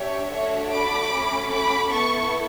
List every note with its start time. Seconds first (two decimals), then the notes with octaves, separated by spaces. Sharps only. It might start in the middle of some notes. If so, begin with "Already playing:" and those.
Already playing: D4 G4 C#5 E5
0.30 A3 D4 F#4 A4 C#5 E5
0.70 B5 D6
1.10 A3 C#4 F#4 A4
1.49 B5 D6
1.88 B3 E4 A4 A5 C#6